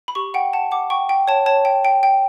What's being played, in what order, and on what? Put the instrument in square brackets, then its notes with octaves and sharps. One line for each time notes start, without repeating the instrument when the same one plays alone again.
[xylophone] B5
G4 C#6
F#5 G5
F#5 A5
F#5 D6
G5 C#6
G5
C#5 A5
C#5 A5
G5
G5
G5